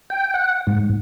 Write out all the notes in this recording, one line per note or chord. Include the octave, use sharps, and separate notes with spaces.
G5
F#5
G#2